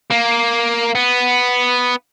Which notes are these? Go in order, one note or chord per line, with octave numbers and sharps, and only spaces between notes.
A#3
B3